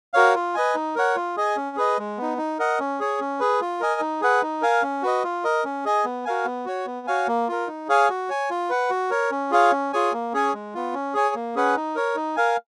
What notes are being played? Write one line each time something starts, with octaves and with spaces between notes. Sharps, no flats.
F#4 A#4 C#5 F5
F4
B4 D#5 G#5
D#4
A#4 C#5 F#5
F4
G#4 D#5 G#5
C#4
G#4 B4 D#5
G#3
B3 D#4
D#4
A#4 D#5 F#5
C#4
G#4 C#5
C#4
G#4 B4
F4
A#4 D#5 G#5
D#4
G#4 B4 F#5
D#4
A#4 F5 G#5
C#4
F#4 B4 D#5
F4
A#4 D#5
C#4
G#4 D#5 G#5
B3
F#4 A#4 F5 G#5
B3
F#4 C#5
B3
F#4 C#5 F5 G#5
A#3
F4 A#4
D#4
G#4 C#5 F5 G#5
F#4
C#5 G#5
F4
B4 F#5
F#4
A#4 C#5
C#4
F4 G#4 C#5 F5
C#4
F4 G#4 C#5 G#5
A#3
C#4 G#4 C#5 G#5
G#3
B3 F4
C#4
G#4 C#5 G#5
A#3
C#4 G#4 B4 F#5
D#4
A#4 C#5
D#4
A#4 F5 G#5